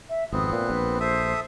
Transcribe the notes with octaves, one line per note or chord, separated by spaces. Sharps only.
E5
G#1 F2 B3 C4 D#6
A#2 B4
A#1
A4 C5 E5 D#6